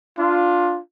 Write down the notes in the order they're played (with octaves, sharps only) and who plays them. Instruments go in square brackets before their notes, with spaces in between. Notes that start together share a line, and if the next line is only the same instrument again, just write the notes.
[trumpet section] D4 F4